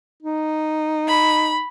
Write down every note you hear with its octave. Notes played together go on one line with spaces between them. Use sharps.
D#4
B5